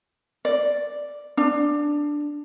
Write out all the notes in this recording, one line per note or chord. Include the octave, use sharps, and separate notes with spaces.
D5
D4